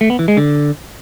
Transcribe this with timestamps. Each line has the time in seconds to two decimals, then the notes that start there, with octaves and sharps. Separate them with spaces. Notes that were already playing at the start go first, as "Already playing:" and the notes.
0.01 A3
0.10 B3
0.19 E3
0.28 G#3
0.37 D3